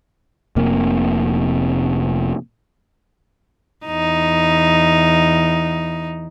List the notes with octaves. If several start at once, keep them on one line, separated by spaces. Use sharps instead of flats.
F1 C3 A#3
E2 D#4